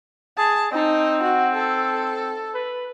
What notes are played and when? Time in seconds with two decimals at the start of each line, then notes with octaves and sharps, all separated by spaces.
0.38 G#4 A5
0.72 C4 D#4
1.23 F#4
1.55 A4
2.54 B4